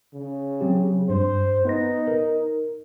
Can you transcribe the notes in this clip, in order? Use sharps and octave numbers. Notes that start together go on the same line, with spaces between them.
C#3
F#3 C4 G4
G2 C5
B3 D#4 B4 A#6
A#4